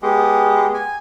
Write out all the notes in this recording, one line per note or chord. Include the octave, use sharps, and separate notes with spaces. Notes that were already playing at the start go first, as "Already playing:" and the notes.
G#3 B3 G4
G#5